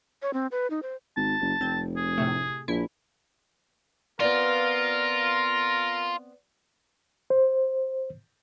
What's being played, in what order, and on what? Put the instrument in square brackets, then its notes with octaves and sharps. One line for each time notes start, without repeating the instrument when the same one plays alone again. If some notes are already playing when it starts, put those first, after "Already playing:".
[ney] C#5
C4
B4
D#4
C5
[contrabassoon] G#1 [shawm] A5
[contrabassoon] F#1
[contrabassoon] F1 [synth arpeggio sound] C4
[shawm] G#4
[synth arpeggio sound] A2 C3 A3
[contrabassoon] A#1 [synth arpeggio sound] E4
[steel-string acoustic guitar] B3 C4 D5 [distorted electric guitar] F4 [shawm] A#4
[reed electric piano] C5